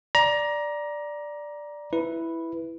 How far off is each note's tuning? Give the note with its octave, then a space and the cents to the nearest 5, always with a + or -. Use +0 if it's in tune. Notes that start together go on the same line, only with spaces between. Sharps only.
D5 +0 A#5 +20
E4 +0 B4 +0